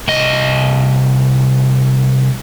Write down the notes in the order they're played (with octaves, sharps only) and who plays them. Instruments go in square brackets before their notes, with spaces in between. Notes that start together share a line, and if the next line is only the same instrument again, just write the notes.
[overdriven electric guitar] C2 D#5